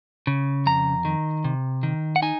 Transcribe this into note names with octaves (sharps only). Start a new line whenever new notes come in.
C#3
F2 A#5
D#3
C3
D#3
F#5
D#4 G#5